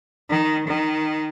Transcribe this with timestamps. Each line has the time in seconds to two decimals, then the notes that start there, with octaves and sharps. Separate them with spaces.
0.30 D#3
0.67 D#3